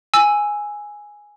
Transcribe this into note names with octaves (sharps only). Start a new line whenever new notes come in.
G#5 E6